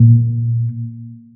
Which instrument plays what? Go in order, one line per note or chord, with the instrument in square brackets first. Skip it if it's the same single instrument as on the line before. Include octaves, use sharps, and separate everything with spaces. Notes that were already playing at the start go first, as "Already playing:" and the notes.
Already playing: [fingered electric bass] A#2